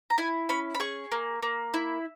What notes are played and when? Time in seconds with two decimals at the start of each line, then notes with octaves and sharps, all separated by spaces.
0.10 A#5
0.18 E4 G#5
0.49 C#4 B5
0.75 B5
0.80 G#4 C#6
1.12 A#3
1.42 A#3
1.74 E4